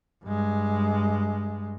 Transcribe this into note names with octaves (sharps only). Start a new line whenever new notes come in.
G2 G#3